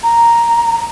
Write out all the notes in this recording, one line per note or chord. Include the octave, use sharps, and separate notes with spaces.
A#5